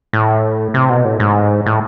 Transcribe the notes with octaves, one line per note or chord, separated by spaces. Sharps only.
A2
C3
B2
A2
G#2
A2